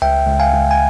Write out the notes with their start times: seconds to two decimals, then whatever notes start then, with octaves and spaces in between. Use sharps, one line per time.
0.02 C#2 E5 G5
0.27 C#2
0.40 F5 G#5
0.54 C#2
0.71 G#5